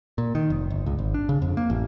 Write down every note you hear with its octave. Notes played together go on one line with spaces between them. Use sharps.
A#2
D#3
F1
G1
C#2
G#1
D4
C#3
F2
A#3
A1